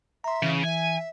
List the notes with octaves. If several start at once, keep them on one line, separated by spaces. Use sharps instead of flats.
E5 A#5 C6
C#3 E3
E5 G#5